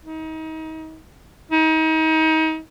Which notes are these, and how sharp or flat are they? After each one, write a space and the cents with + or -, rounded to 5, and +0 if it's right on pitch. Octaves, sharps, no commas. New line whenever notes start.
D#4 +35
D#4 +35